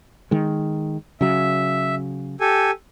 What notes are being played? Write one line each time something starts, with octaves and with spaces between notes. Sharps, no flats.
D#3 G#3
C#3 F#3 E5
G4 A4 G#5